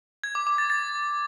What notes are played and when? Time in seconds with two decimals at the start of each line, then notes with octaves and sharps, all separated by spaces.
0.24 G#6
0.35 D6
0.47 D6
0.58 A6
0.70 A6